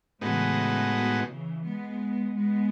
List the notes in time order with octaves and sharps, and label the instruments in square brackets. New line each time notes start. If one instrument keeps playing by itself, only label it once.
[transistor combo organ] A2 G#3 B3 D#4 F#4 [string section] C#3 E3
[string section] B2 D#3
C#3 E3
G#3 B3
G#3 B3